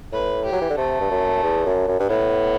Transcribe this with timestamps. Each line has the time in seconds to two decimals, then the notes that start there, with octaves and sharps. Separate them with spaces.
0.12 A2 B4
0.45 G4
0.53 F#3
0.61 E3
0.70 D3
0.78 C3 A3
1.00 G2
1.11 F#2
1.43 E2
1.66 F#2
1.88 F#2
2.00 G2
2.09 A2 B3